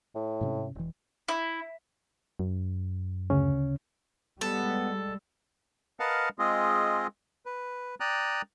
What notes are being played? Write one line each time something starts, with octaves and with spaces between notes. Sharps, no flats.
A2
G#2 C3 C#4
E1 E3
E4
F#2
D2 C#3 C#4
G3 G#3 B3 A4
A#4 B4 D#5 F5 F#5 A5
G#3 C4 F4 G#4 D#5
B4
D5 G5 A#5 D#6 F#6